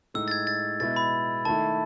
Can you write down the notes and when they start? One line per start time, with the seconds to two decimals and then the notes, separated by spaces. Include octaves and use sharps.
0.14 A2 G#3 D#4 E6
0.28 A6
0.31 G#6
0.47 A6
0.80 B2 G#3 B3 E4 A6
0.96 B5
1.45 D#3 A3 E4 A5